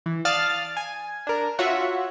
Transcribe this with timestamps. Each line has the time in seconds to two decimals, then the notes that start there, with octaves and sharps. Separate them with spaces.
0.06 E3
0.25 D5 F5 A5 D#6 F6 A6
0.77 G#5
1.27 D4 A#4
1.59 F4 F#4 C#5 E5 F#5